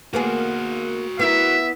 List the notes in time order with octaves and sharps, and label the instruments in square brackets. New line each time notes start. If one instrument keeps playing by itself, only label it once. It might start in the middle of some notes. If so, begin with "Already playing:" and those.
[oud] A#3 B3 G#4 [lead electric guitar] F#4 C5
[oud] B3 E4 A#4 [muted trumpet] E5